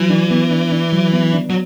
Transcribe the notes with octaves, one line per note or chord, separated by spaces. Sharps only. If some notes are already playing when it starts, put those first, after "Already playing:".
Already playing: E3 F#3
D4
B3
D4
D4
F#3
B3
D4
F#3